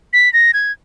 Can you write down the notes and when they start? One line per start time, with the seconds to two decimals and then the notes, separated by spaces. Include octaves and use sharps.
0.13 B6
0.33 A#6
0.54 G#6